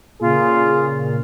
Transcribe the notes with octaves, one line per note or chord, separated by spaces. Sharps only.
A#2 C#3 F4 G#4